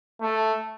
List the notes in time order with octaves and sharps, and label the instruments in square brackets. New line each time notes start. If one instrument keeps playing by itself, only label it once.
[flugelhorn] A3